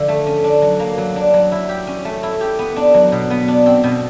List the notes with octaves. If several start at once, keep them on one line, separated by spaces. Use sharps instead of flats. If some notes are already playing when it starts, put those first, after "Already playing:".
Already playing: D3 F3
A3
C#4
D4
F#3
A#3
F#3
D4
F#3
E4
G4
C#4
A3
E4
G4
B3
D4
F#3
B2
B3
D4
C4
B2